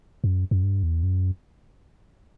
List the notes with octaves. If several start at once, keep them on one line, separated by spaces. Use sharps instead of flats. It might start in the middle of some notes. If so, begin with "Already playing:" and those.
F#2
F#2
G2
E2
F#2